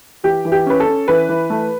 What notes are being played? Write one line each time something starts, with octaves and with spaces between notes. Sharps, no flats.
E3 G4
E3
G4
C#4 B4
A4
C#4
E3 B4
E3
A3